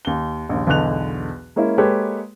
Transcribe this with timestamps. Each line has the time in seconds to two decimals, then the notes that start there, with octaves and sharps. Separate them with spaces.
0.05 D#2 G7
0.49 A#1 D#2
0.67 B1 E2 D3 D#5 F#6 F7
1.56 G#3 A#3 C#4 E4
1.78 G#3 A#3 G4 A4 B4 C#5